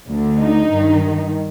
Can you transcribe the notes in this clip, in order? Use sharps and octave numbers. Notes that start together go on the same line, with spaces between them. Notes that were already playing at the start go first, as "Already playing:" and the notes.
D2 D3
D#4
G2 D#3